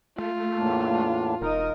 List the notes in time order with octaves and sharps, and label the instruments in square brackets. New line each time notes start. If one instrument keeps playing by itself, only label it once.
[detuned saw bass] A3 [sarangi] F4
[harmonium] E2 A2 D4 [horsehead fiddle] A#3
[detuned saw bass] E1 [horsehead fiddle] D#4 D#5 [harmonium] A#4